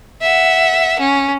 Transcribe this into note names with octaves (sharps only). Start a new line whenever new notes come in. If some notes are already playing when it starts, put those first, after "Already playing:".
E5 F#5
C#4